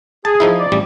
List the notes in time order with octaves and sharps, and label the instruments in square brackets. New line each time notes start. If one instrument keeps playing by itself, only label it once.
[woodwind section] G#4 [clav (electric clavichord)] A5
[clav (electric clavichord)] F3 D#4 E4
[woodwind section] D5
[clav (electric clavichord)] A1 G3